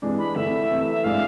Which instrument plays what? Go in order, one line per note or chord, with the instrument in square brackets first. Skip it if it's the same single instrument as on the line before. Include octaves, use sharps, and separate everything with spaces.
[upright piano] C3 E3 G#3 D4
[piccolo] B5
[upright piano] D3 A3 E4 [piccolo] E5
[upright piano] C3 E3 A3
[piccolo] E5
[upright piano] A2 G#3 D4 [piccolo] F5